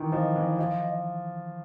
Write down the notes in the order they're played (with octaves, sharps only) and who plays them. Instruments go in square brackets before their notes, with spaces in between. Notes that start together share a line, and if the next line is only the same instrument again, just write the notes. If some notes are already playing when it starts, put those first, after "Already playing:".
Already playing: [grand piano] D#3 E3
[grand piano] F3 [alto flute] D#5
[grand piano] E3
[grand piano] F3 [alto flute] D#5